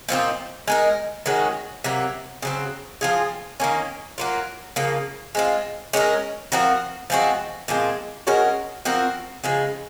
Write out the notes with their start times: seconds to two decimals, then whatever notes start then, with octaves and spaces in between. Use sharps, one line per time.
0.09 A#2 F3 C4 D#4
0.68 G#3 D#4 A#4
1.26 D#3 G#3 C#4 F#4
1.84 C3 F#3 A#3
2.42 C#3 F#3 C4
3.01 F3 C4 F4 G#4
3.60 D#3 A#3 C#4
4.18 F#3 A#3 F4
4.76 C#3 F3 A#3
5.35 G#3 C4 F4
5.93 G#3 C#4 F4 A#4
6.52 F3 C4 F#4 A#4
7.10 F3 G#3 C4 F#4
7.68 A#2 F3 G#3 C4
8.27 G#3 C#4 F#4 A#4
8.85 F3 C4 F#4 A#4
9.44 C#3 F3 G#3